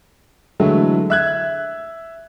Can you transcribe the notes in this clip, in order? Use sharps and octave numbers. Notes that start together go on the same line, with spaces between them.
D3 E3 F#3 G#3 A3 E4
E5 F#6 G#6